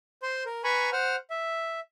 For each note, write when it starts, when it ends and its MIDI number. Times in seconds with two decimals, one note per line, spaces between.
0.23 0.43 72
0.23 0.43 84
0.46 0.62 70
0.64 0.90 71
0.64 0.90 80
0.64 0.90 82
0.64 0.90 83
0.64 0.90 85
0.92 1.16 72
0.92 1.16 78
0.92 1.16 89
1.30 1.80 76